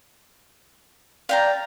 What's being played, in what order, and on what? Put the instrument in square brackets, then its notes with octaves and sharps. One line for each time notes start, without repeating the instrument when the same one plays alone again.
[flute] D5 [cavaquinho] F5 G5 A#5